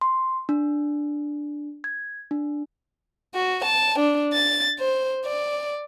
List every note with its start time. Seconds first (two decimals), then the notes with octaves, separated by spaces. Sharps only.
0.01 C6
0.49 D4
1.84 G#6
2.31 D4
3.35 F#4
3.65 A5
3.99 D4
4.34 A6
4.80 C5
5.25 D5